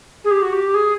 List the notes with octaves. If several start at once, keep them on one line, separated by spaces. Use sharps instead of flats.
G#4
G4
F#4
G4
G#4